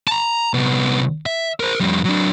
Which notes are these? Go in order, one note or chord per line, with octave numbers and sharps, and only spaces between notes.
A5 A#5
C2 B3
E5
A#4 C5
F2 G3
F#3 D4